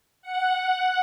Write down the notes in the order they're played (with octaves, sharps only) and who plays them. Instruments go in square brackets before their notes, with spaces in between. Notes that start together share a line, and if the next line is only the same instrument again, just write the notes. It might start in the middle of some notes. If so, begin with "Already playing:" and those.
[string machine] F#5